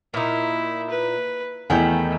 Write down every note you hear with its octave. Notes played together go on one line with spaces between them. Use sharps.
A#2 D#4 E4
B4
E2 D#3 A3 E4 G5